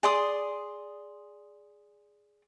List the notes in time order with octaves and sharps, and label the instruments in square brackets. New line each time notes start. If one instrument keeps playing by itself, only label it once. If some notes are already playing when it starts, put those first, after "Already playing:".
[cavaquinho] G#4 D5 C6 D#6